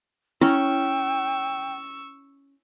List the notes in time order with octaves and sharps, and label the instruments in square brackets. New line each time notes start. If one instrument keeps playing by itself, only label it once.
[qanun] C#4 [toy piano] E4 [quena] G5 [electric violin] C#6 E6